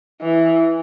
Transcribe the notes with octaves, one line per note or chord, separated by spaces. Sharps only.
E3